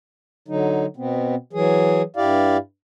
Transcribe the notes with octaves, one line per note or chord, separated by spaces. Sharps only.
D3 F#3 D#4
B2 B3 C4
E3 F#3 G#4
G2 E4 G4 D5 F5